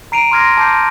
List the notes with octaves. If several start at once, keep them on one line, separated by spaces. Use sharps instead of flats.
A#5 C7 D7 D#7 F7
C6 D6 F6 G#6 A#6 C7
A5 D6 G6 C7